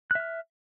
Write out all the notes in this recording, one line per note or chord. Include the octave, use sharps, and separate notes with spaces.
E5 F6 F#6